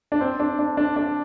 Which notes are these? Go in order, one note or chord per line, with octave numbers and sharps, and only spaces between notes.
D4
C4
D4
D4
D4
D4